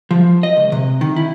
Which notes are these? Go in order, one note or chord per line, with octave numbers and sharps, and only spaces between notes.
F3
D#5
C#2
C3
D#3
E4